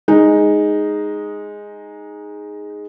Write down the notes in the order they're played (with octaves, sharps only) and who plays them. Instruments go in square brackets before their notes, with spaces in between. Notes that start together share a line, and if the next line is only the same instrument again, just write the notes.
[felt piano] G#3 D#4